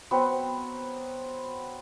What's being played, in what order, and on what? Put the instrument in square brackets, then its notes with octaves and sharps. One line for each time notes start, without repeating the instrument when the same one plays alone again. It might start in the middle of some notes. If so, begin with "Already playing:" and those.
[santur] F#3 B3 C4